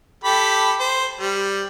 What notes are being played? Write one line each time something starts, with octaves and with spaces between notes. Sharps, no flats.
G4 A4 B5
C5
G3